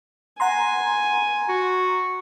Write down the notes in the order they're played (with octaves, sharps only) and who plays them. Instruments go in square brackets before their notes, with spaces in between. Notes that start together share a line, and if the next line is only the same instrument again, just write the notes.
[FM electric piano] F#5 A#5 C6 [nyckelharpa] G#5
[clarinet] F#4